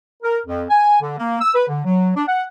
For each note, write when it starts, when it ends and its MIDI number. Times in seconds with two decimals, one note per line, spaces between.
0.23 0.40 70
0.46 0.63 41
0.69 0.98 80
1.02 1.14 50
1.18 1.37 58
1.41 1.51 88
1.55 1.65 71
1.68 1.81 50
1.85 2.11 54
2.15 2.23 62
2.28 2.44 78